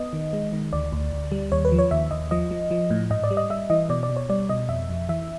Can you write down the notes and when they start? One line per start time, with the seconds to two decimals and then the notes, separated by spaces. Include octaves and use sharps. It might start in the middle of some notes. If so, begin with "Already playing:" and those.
Already playing: B3 D#5
0.13 D#3
0.33 G#3
0.53 D#3
0.73 D2 D5
0.92 D2
1.12 D2
1.32 G3
1.52 D#2 C#5
1.65 B4
1.72 F3
1.79 C#5
1.91 D#2 E5
2.11 D#2 D#5
2.31 F3 D#5
2.51 F3
2.71 F3
2.90 A2
3.10 G#2 D#5
3.24 D5
3.31 G3
3.37 D#5
3.50 G3 E5
3.70 E3 D#5
3.89 B2 D5
4.03 D5
4.10 B2
4.16 C#5
4.29 G3 D5
4.49 B2 D#5
4.69 F2 E5
4.89 F2
5.09 E3 E5